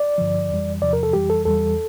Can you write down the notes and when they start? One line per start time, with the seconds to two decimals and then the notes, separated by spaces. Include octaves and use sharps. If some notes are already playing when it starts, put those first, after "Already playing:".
Already playing: D5
0.18 G2 D3 F3
0.50 F2 E3 G3
0.82 E2 C3 F3 D5
0.93 A#4
1.03 A4
1.13 F2 E3 G3 G4
1.30 A4
1.45 E2 E3 G3 A4